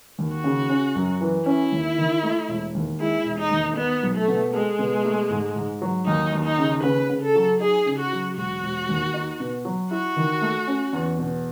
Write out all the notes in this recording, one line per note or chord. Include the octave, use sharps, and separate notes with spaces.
D#2
F#4
C#3
C#4
F#2
E3
C#4 E4
D#2
D#3
A3
E1
D#2
G#3 E4
E1
D#4
D#2
B3 D#4
B1
A3
B2
G#3 A4
B2
A3
G#2
G#2
F#3
D#2 D#4
D#2
D#4
C#3
C#3 B4
C#3
A4
F#3
D#4 G#4
C#3
F#4
F#3
E1 F#4
E1
D#2
D#4
B2
F#3
E4 F#4
D#3
A3
C#4
E2
B2